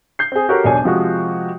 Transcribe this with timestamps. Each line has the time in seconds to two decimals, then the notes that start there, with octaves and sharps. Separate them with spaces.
0.19 G6 C7
0.32 C4 G#4
0.49 F#4 G4 A4 A#4 C#5 F#5
0.64 E1 B1 D4 C#5 G#5
0.84 C3 F3 G#3 F#4